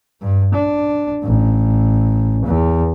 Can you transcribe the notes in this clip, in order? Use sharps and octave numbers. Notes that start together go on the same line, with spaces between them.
G2
D4
A1
E2